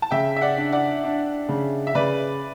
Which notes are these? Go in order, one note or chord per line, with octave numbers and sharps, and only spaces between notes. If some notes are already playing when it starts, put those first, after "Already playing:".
A5
C#3 E5 G5
E5
D5 F#5
D4
D5 F#5
D4
C#3
E5
C#3 B4 D5